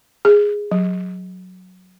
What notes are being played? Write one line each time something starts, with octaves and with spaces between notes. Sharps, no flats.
G#4
F#3